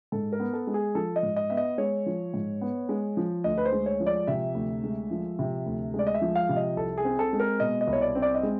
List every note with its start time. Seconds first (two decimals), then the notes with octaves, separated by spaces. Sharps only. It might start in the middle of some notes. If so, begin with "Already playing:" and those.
0.12 G#2 A4
0.32 A#4
0.40 B3
0.53 A4
0.67 G#3
0.74 G#4
0.95 F3 A4
1.16 D#5
1.23 G#2
1.36 D#5
1.50 B3 E5
1.57 D#5
1.78 G#3 C#5
2.06 F3
2.34 G#2
2.61 B3
2.89 G#3
3.17 F3
3.44 D2 D#5
3.58 B4
3.65 C5
3.72 G#3
3.86 C#5
4.00 F3
4.07 D5
4.27 C3 E5
4.55 D2
4.83 G#3
5.11 F3
5.39 C3
5.66 D2
5.94 G#3
5.99 D5
6.07 D#5
6.14 E5
6.22 F3
6.36 F5
6.49 C3
6.56 D#5
6.77 C2 A4
6.98 G#4
7.05 C4
7.19 A4
7.33 G#3
7.40 A#4
7.60 B2 D#5
7.81 D#5
7.87 C2
7.93 C#5
8.02 D5
8.15 C4
8.22 D5
8.35 D#5
8.43 G#3